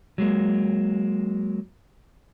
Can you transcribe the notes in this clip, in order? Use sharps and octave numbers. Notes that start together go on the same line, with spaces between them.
F#3 G#3 A#3